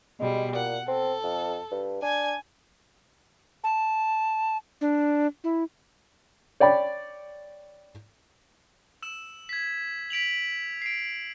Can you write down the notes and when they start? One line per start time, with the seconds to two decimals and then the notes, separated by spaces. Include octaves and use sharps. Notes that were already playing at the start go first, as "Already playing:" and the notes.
0.20 B2 G3 G#3
0.55 A#2 F#5
0.88 C4 A4
1.23 F2
1.71 G2
2.02 D4 G#5 G#6
3.64 A5
4.81 D4
5.44 E4
6.60 C#5 D5 G5 B5
9.03 E6 E7
9.49 G#6 B6
10.10 B6 D7 F7 F#7
10.82 C7 D7